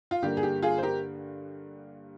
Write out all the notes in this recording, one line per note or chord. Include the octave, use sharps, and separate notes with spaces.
F4
G2 D3 G3 A#3 G4
G#4
G4
F4 G#4
C5
G4 A#4